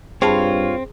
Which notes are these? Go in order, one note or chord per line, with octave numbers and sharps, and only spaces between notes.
G2 C4 F4 G#4 C#5 A5 B5